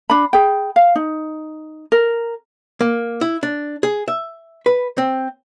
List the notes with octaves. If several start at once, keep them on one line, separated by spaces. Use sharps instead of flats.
D4 B5
G#4 G5
F5
D#4
A#4
A#3
E4
D4
G#4
E5
B4
C4